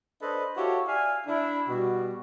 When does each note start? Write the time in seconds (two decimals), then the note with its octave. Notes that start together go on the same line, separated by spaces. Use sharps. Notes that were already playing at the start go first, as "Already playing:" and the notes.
0.22 D4 A4 B4 C5 D#5
0.57 E4 F#4 G4 A4 C#5 F5
0.87 D5 E5 F5 G#5
1.27 D4 E4
1.68 B2 G3 F#4